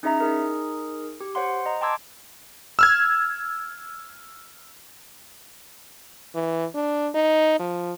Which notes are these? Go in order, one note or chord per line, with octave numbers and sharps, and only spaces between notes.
C#4 D#4 E4 G#4 E5 A#5
D#4 G#4 A#4
G4
C5 C#5 F#5 C6
D#5 A#5
G5 A5 C6 D6 E6 G#6
E6 F6 G#6
E3
D4
D#4
F3